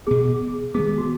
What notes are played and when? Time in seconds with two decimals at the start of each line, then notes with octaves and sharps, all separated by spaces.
0.07 B2 B3 G#4
0.75 D#3 G#3 B3 G#4
0.98 F#4